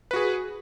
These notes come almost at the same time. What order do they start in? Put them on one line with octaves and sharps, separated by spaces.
B4 F#4 G#4